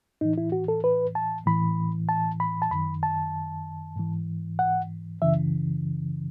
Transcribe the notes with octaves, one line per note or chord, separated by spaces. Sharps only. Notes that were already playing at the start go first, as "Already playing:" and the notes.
A2 E3 D#4
E4
F#4
A4
B4
A5
A2 E3 B5
A5
B5
A5
F#2 D#3 B5
A5
G#2 E3
F#5
F#2 C#3 E3 E5